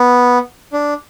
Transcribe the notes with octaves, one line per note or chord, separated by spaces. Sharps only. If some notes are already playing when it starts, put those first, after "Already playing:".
Already playing: B3
D4